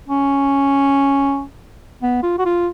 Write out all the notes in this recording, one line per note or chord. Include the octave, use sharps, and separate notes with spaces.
C#4
B3
F4
F#4
F4